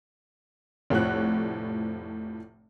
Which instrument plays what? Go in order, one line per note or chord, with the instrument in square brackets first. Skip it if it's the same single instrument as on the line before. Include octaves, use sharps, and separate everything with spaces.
[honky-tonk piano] F1 A2 F3 C#5 F#5 F#6